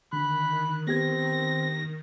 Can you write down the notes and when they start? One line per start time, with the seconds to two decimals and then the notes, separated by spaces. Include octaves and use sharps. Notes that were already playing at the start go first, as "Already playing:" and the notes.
0.13 D3 D#3 B5 F#6
0.87 B3 C4 G4 G#6 A#6